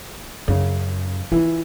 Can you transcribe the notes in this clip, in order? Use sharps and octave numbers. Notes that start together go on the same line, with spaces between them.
F#2 C#3
E3 F4